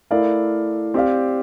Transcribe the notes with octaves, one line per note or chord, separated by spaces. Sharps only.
A3 E4 A#4 D5 F5
C4 G4 D5 F5